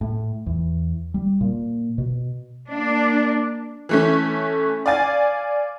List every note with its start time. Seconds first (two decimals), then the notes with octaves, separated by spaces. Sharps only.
0.01 A2
0.46 E2
1.14 G3
1.41 A#2
1.98 B2
2.68 A#3 D4
3.89 E3 A3 C#4
4.86 D5 F5 G#5 A6